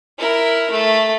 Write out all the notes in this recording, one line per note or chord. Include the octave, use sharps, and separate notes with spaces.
E4 A#4
A3